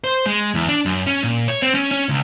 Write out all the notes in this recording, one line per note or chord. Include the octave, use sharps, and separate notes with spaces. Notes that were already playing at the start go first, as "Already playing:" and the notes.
C5
G#3
E2
D4
F#2
C#4
A#2
C#5
C4
C#4
C#4
C#2